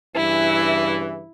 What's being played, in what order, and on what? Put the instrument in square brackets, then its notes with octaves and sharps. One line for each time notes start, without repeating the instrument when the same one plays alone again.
[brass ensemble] G2 C#3 E3 [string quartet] E4